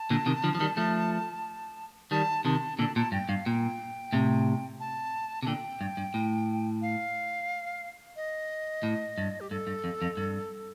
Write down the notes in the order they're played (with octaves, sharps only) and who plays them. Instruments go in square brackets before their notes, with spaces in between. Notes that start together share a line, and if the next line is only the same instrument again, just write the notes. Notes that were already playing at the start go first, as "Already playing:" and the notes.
Already playing: [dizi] A5
[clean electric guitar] A#2 D3
C3 D#3
D3 F3
F3
D#3 G3
F3 A3
[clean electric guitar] D#3 G3 [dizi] A5
[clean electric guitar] C3 D#3 [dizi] A5
[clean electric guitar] A#2 D3 [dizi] A5
[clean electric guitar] A#2 [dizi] A5
[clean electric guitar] G2 [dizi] G5
[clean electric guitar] G2 [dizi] F5
[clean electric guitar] A#2 [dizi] G5
[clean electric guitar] A2 C3
[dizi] A5
[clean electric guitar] C3 [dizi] A5
[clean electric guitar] A#2 D3 [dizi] G5
[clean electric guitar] G2
G2
A2
[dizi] F5
D#5
[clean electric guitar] A2
G2
[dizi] G4
[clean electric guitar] G2 [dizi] A4
[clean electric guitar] G2
F2
F2
G2